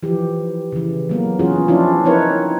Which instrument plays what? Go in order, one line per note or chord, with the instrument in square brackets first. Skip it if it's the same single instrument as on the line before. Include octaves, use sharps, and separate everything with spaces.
[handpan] E3 F3 G4
C#3 E3
F#3 A#3 B3
E3 C#4 F4 F#4 G#4
F3 C#4 D4 E4 F4
C4 D#4 E4 A#4 B4 C#5